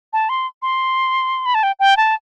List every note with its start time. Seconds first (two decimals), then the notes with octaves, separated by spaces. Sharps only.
0.13 A5
0.29 C6
0.62 C6
1.46 B5
1.54 A5
1.63 G5
1.79 G5
1.97 A5